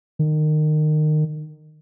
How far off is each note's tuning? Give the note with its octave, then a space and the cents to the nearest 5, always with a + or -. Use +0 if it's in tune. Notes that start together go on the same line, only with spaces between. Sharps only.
D#3 -25